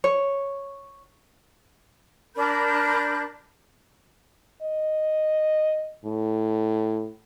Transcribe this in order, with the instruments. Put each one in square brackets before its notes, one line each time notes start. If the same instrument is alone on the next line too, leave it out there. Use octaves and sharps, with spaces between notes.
[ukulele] C#5
[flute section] D4 A#4 B5 G6
[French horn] D#5
A2